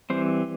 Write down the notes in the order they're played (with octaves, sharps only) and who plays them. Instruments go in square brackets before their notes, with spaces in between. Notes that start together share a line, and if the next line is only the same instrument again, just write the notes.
[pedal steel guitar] E3 G3 C4 C5